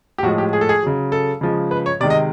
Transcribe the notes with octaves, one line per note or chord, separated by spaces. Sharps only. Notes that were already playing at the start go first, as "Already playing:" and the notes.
G4
A2 F3 G#3 F#4
G4
G#4
A4
G#4
C#3 F#3
A4
C#3 F3 G#3
B4
C#5
C3 D#3 G#3 D5
D#5